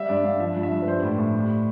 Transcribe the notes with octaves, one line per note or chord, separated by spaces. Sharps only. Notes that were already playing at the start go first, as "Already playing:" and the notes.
Already playing: G3 E5
G2 D5
G2 F5
F3 E5
G2
E5
G2
B4
G3 C5
A2
A2
G3